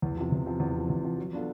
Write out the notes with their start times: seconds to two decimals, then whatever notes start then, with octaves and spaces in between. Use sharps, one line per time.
0.02 E2
0.17 C3 F3
0.32 E2
0.46 C3 F3
0.60 E2
0.75 C3 F3
0.90 E2
1.04 C3 F3
1.18 F#3
1.33 B3 D4 F4 A4